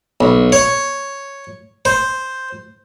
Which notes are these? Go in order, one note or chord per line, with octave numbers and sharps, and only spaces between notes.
B1
C#5
C5